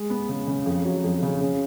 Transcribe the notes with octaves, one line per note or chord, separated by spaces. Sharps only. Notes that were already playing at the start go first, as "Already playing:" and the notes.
Already playing: G#3
B3
C#3
C#3
F2
F#3
F2
C#3
C#3